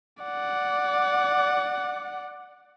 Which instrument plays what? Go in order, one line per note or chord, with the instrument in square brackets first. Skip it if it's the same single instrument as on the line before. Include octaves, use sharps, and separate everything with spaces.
[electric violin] D5 F#5